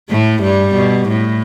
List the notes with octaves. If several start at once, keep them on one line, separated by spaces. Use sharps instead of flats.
A2 A3
G2 G3
B2
A2